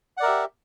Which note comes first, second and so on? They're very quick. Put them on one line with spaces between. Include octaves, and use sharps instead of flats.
F#5 D5 A#4 E5 G4